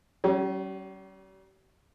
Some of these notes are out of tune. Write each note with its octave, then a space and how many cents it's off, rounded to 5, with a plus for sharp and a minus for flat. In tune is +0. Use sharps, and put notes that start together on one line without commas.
G3 -45 C#4 +0 G4 -15